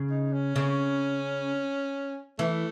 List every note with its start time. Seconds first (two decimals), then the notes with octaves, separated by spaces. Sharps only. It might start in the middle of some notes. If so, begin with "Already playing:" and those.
Already playing: C#3
0.10 D#4
0.33 C#4
0.56 C#3
2.39 E3 A3